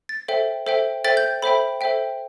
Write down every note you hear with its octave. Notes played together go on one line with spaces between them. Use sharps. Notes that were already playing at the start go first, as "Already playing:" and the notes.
A6
A4 C5 E5 G5
A4 C5 E5 G5
A4 C5 E5 G5 A6
G6
A4 C5 E5 G5 B5
A4 C5 E5 G5